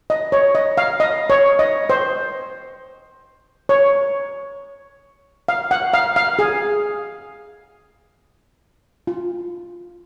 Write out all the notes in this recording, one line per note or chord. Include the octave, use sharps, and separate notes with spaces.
D#5
C#5
D#5
F5
D#5
C#5
D#5
C5
C#5
F5
F#5
F5
F5
G#4
F4